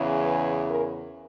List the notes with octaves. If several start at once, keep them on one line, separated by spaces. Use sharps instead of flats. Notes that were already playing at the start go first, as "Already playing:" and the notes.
Already playing: E2 C#3 E3
B4
A#4